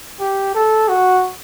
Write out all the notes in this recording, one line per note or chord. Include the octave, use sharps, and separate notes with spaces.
G4
A4
F#4